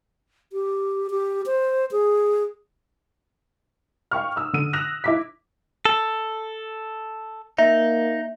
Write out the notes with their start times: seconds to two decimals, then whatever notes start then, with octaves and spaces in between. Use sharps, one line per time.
0.53 G4
1.10 G4
1.46 C5
1.92 G#4
4.11 F5 G5 C#6 F6
4.36 D#6 E6
4.53 D3 D#7
4.73 D#6 E6 F#6 A#6 E7 F7
5.04 E4 D6 B6
5.85 A4
7.58 A#3 D#4 E5